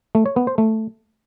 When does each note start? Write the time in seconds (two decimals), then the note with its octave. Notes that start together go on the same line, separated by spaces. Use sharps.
0.15 A3
0.26 C#5
0.36 B3
0.47 C5
0.58 A3